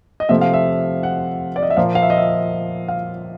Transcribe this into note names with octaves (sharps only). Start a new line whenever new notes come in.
D#5
C3 F3 A3 E5
F5
E5
F#5
D5
D#5
E5
A#2 F3 A#3 F5
F5
E5
D#5
E5
F5